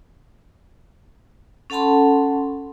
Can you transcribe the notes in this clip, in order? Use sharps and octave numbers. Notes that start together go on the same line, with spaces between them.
C#4 A4 F#5 A5 B5 C6